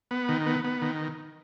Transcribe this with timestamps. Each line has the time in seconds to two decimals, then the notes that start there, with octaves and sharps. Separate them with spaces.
0.11 B3
0.29 D#3
0.46 B3
0.64 B3
0.82 D#3